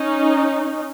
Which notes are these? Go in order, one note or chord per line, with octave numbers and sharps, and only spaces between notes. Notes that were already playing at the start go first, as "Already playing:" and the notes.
Already playing: C#4 D#4